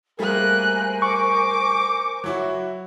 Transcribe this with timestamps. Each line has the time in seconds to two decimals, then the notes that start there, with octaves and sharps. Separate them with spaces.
0.19 G3 A3 A#3 G#4 A#4 C5 G#5 F#6
1.02 C#6 D6
2.24 F#3 E4 F#4